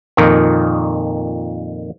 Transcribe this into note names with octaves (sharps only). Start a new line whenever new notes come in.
F2 A#2 D#3